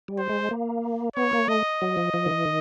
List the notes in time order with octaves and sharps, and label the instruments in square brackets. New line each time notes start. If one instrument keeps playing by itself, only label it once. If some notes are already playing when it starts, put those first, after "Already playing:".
[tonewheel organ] G3
[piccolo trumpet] C5
[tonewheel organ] G#3
A#3
[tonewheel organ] B3 [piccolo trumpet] C#5
[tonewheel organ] A#3
[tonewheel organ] A3 [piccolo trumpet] D#5
[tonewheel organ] F#3
F3
F3
D#3
E3
D#3